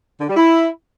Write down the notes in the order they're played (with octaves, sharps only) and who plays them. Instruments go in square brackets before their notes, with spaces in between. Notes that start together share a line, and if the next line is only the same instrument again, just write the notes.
[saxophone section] D3
G3
E4